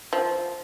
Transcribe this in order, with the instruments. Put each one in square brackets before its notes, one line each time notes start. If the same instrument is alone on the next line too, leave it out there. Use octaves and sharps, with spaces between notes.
[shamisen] F3